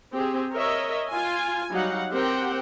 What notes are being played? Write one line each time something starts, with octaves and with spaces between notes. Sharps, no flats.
C4 G4 G#4
A#4 C#5 D#5 E5
F4 G#5
F#3 G3 D#4 F5 F#5
C4 G4 A#4 C5 F#5 G5